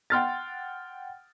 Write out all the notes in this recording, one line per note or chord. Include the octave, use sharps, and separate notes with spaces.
F#5 G5 C6 F6 F#6 A6